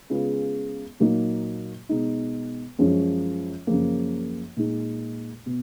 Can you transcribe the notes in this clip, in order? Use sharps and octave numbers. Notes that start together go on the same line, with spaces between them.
C#3 G#3 B3 F4
A#2 F#3 A#3 D#4
B2 G#3 D#4
F#2 F3 G#3 C#4 F4
F#2 C#3 F3 A#3
A#2 G#3 D#4
B2